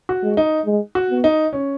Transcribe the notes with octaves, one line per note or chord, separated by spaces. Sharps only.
F#4
G#3
D#4
G#3
F#4
B3
D#4
C#4